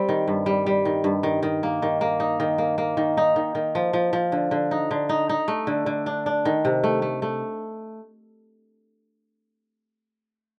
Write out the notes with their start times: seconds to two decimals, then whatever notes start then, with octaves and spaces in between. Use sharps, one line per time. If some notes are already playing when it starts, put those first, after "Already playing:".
Already playing: G3 C4
0.09 D#3
0.28 G2
0.46 G3
0.66 G3
0.85 D#3
1.04 G2
1.23 D#3
1.43 D#3
1.63 A#3
1.82 D#3
2.01 A#3
2.20 D#4
2.40 D#3
2.58 A#3
2.78 A#3
2.97 D#3
3.17 D#4
3.36 D#3
3.55 D#3
3.75 F3
3.93 F3
4.13 F3
4.32 D3
4.51 D3
4.71 D#4
4.91 D3
5.09 D#4
5.29 D#4
5.48 A3
5.67 D3
5.86 D3
6.06 D4
6.26 D4
6.45 D#3
6.65 C3
6.84 A3
7.02 A3
7.22 A3